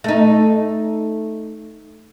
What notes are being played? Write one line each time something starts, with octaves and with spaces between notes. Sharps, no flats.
A3 D#4